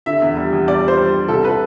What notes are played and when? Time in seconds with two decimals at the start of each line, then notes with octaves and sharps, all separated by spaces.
0.06 D3 E5
0.22 E2
0.37 G3
0.53 E2
0.68 G3 D5
0.83 G3
0.88 C5
0.98 G3
1.14 G3
1.28 C2 A4
1.45 B4